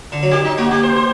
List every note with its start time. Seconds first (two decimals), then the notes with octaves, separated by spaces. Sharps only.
0.12 D3
0.23 F#3
0.31 D#3 G4
0.45 D#4
0.58 A#3 F#4
0.71 G4
0.83 C5
0.96 C5